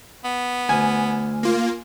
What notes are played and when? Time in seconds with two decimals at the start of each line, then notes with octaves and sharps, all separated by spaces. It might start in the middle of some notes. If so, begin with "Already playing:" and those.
0.24 B3
0.69 D2 G#5
1.43 A#3 F4